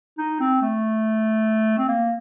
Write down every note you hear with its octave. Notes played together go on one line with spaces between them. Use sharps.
D#4
C4
A3
C4
A#3